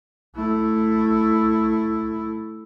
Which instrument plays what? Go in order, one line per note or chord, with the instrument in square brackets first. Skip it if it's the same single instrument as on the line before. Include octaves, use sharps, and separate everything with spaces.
[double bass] A3 E4